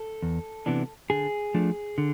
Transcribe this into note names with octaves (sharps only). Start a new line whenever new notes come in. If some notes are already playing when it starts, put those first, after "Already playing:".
Already playing: A4
E2
C3 E3 B3 D4
D3 G#4
F3 A3 D4
D3